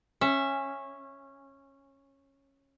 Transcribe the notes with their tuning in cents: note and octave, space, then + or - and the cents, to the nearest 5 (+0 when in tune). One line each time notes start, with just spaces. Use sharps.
C#4 -15 E5 +0